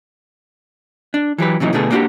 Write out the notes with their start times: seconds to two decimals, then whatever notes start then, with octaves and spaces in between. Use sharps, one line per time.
1.14 D4
1.38 E3 F#3 G4 B4
1.60 A#2 C#3 E3 F#3 D#4
1.73 B2 D3 A3 B3 G#4
1.90 A#3 B3 D4 D#4 F#4 G4